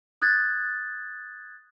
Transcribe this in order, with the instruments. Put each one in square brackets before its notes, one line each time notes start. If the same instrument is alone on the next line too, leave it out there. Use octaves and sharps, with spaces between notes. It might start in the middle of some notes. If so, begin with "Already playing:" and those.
[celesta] D#6 F#6 G#6 A6